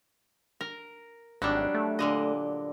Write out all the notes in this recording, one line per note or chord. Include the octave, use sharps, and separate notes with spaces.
A#4
G#1 F#3 G3 D4
A3
A#2 D3 D#5